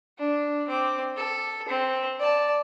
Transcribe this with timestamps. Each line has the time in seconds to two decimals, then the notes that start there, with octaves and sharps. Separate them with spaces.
0.19 D4
0.68 C4 D6
1.16 A4
1.68 C4
2.20 D5 A5